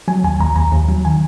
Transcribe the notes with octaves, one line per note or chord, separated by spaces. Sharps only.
F#3 G#5
D#2 G#5
D#2 A#5
D#2 A#5
D#2
F#3
D#3 G#5